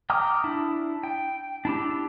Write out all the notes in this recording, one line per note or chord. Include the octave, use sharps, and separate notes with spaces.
G5 A#5 D6 D#6 F6
D4 E4
G5
D4 E4 G4